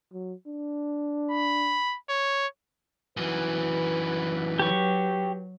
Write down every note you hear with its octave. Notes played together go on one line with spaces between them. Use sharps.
F#3
D4
B5
C#5
F#2 E3 D#4 F#4 B4
F#3 G4 C#6